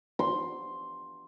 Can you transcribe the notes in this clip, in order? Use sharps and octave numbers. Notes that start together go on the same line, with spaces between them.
C6